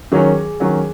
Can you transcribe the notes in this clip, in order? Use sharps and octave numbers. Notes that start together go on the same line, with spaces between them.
D#3 F#3 C#4 G#4
D#3 F#3 C#4